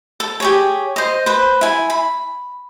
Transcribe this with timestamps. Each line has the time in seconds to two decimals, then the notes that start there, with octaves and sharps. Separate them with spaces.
0.20 A4
0.40 G4 G#4 C#5
0.96 C5 D#5
1.26 B4 C5
1.61 E4 G#5
1.90 B5